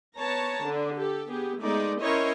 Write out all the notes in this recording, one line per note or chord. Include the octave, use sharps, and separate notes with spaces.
B3 C#5 A5 A#5
D3 D4
G4 A4
B3 G4 G#4
G#3 A3 B3 D#4 D5
C#4 E4 A#4 C5 C#5 D#5